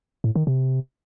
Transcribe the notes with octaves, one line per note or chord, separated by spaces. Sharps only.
A2
D#3
C3